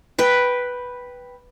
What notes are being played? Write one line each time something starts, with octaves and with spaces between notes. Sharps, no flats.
B4 G5